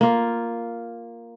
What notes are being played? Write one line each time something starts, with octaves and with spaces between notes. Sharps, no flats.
A#3 F4